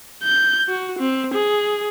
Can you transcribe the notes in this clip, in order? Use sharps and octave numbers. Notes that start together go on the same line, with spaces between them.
G6
F#4
C4
G#4